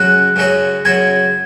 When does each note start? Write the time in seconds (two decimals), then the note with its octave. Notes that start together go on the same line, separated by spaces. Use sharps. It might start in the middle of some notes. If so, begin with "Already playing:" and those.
Already playing: F#2 C#3 F#3 C#4 F#4 F#6
0.36 F#2 C#3 F#3 C#4 F#4
0.85 F#2 C#3 F#3 C#4 F#4 G#6